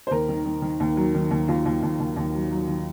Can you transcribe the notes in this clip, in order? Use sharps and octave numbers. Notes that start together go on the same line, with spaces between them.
C5
D#2 A#4
D#3
D#3
D#3
D#2
F#3
D#3
D#2
D#2 F4
D#2
D#2
D#2
D#2
F#3
F#3
D#3